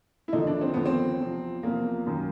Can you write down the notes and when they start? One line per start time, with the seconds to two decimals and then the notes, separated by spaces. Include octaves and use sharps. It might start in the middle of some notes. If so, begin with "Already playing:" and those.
0.28 E4
0.33 D#2 D3 F3 D#4
0.47 D4
0.61 C4
0.74 D#2 D3 F3 B3
0.86 C4
1.19 E2 C3 F3
1.63 E2 C3 F3 A#3
2.06 F#2 D#3